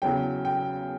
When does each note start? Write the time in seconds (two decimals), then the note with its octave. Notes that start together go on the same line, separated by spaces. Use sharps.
0.02 E2 C#3 F#3 G5
0.45 G5